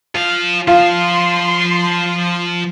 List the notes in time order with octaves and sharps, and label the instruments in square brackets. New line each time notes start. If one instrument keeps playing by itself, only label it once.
[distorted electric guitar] F3 F5
[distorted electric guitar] F3 [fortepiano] F4 [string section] C6